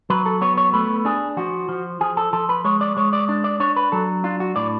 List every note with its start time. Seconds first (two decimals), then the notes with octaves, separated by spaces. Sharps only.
0.10 F#3 B4
0.26 A4
0.41 B3 C#5
0.58 C#5
0.73 A3 B4
1.05 D4 G#4
1.37 F3 F#4
1.69 F3
2.01 F3 G#4
2.17 A4
2.33 F3 A4
2.49 B4
2.65 G#3 C#5
2.81 D5
2.97 G#3 C#5
3.13 D5
3.29 D4
3.44 D5
3.60 D4 C#5
3.76 B4
3.92 F#3 A4
4.24 D4 F4
4.40 F#4
4.56 A2 D5